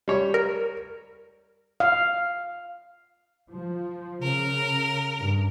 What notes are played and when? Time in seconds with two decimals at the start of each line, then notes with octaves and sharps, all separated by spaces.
0.08 G3 C#5
0.34 A#4
1.80 F5
3.50 F3
4.23 C#3 A#4
5.17 G2